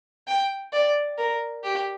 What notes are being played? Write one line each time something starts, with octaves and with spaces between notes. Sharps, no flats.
G5
D5
A#4
G4